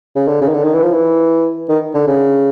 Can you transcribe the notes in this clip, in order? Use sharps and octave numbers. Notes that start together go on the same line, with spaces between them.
C#3
D3
C#3
D#3
D3
D#3
E3
F3
E3
D#3
D3
C#3